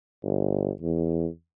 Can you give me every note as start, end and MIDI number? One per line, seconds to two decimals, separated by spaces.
0.23 0.70 31
0.82 1.27 40